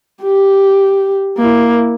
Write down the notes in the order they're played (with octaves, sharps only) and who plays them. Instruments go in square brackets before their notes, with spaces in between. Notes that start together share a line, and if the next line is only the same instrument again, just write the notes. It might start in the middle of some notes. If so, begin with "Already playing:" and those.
[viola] G4
A#3 E4